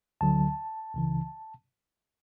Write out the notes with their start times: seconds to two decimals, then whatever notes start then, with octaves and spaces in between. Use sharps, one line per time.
0.21 D2 D3 F#3 A5
0.94 C#2 C#3 E3